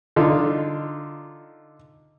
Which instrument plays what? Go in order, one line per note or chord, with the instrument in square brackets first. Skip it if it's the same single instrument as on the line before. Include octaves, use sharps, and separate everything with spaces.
[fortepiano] D3 D#4 F4